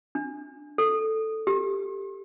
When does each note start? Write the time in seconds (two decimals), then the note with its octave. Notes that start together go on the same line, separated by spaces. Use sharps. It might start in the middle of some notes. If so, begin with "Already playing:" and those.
0.15 D4
0.78 A4
1.47 G4